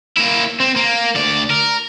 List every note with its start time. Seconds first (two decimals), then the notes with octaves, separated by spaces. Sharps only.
0.17 A#3 E4
0.60 C4
0.76 A#3
1.15 D2 D5
1.50 A#4